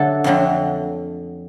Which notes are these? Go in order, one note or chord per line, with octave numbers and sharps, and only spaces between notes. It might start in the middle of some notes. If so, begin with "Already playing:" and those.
Already playing: D3 F#3 A3 A4
F2 D3 F#3 A3